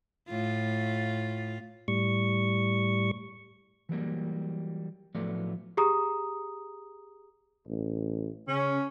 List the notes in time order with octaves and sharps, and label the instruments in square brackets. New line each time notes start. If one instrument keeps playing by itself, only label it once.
[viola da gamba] A2 F4
[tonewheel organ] A2 G3 C#6
[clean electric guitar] E3 F#3 G3 A#3
A2 F3 F#3 A3 B3 D5
[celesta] G4 G#4 A#5 D#6
[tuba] A1
[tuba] C#3 [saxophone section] C#4